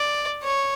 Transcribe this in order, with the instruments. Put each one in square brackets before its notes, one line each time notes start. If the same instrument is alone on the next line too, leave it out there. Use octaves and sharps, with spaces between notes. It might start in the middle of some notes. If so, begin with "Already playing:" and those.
Already playing: [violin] D5
C#5